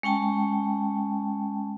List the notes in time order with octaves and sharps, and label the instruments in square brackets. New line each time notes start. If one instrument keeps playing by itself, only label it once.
[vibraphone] G#3 C#4 G5 A5